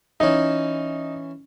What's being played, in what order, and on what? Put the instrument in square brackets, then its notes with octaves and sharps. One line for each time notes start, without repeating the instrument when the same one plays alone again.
[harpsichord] E3 C#4 [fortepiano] D#4